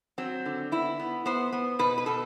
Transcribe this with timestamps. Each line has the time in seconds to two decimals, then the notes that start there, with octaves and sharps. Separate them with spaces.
0.18 F#3 C4
0.46 D3
0.72 B3 E4
0.99 B3
1.26 B3 C5
1.52 B3
1.79 B2 B4
1.98 B4
2.06 B2 A4